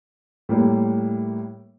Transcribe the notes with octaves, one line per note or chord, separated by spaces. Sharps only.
A2 G3 A#3